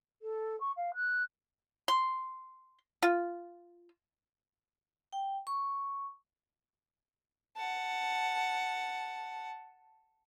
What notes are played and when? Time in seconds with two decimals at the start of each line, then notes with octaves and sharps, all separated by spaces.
0.22 A4
0.60 C#6
0.76 F5
0.94 F#6
1.88 C6
3.02 F4
5.13 G5
5.47 C#6
7.56 F#5 A5